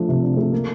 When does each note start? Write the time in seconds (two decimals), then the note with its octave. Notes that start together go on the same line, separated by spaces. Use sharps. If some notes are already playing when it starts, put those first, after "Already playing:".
Already playing: F3 A3 D4
0.09 C3
0.22 D4
0.37 A3
0.52 A#3